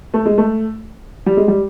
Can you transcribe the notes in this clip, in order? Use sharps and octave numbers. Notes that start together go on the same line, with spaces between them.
A3
G#3
A3
G3
G#3
G3